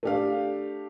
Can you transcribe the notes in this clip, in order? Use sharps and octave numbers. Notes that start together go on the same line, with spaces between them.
A3 D4 G4 F5